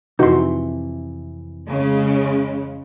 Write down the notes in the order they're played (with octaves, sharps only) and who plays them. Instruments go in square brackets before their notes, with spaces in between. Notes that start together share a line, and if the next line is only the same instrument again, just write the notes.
[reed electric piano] F2 E3 [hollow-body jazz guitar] C3 C6 [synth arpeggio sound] D#4 F#4
[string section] C#3 G#3